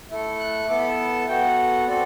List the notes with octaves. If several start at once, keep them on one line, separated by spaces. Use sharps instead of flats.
A3 E4 A4
F#6
B3 E4 A4 D6
B5
A5
B3 F#4 A4 G5
F#5
C4 F#4 A4 D5